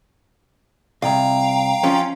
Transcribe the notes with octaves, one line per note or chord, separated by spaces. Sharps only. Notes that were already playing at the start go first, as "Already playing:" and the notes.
C2 F5 G5 A#5
F3 C#4